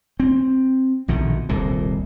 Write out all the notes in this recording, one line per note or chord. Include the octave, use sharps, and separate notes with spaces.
C4
A#1 B2 D3 D#3
D#1 C2 A#2